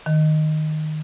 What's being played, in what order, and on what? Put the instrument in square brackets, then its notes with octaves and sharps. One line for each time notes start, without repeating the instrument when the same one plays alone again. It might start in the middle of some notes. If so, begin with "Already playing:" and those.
[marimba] D#3